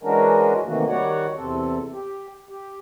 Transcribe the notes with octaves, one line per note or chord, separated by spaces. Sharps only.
E3 G#3 C#4 D4 F#4 A#4
C3 D#3 E3 A3 A#3 F#4
D#3 G3 F#4 C#5 D5 F#5
E2 C3 C4 A4
G4
G4